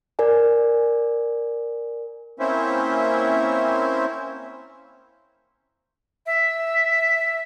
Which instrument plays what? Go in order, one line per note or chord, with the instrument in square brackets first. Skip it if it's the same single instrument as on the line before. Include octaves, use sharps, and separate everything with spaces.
[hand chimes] A#4 D5 G#5
[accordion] A#3 C4 C#4 E4 C5 E5
[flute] E5